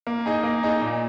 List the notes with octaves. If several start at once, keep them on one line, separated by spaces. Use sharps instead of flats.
A#3
D#4 G#4 D#5
A#3
D#4 G#4 D#5
A#2